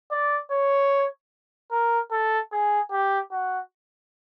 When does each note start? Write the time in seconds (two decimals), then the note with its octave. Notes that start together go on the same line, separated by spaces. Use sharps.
0.11 D5
0.51 C#5
1.71 A#4
2.11 A4
2.52 G#4
2.92 G4
3.32 F#4